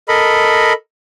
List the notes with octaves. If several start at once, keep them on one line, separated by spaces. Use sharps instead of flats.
A4 A#4 D#5 B5